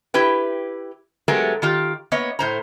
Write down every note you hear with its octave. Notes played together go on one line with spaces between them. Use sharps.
E4 G4 B4 G5
F#3 G#3 A3 B3 G4 A#4
D#3 F4 G4
A#3 B3 C#5 D#5
A2 C5 A#5